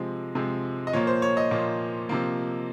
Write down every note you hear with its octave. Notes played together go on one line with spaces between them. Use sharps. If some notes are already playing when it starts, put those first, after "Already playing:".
Already playing: C3 F3 G#3
C3 F3 G#3
D#5
A#2 F3 A#3 C#5
C5
C#5
D#5
A#2 F3 A#3
C3 F3 A#3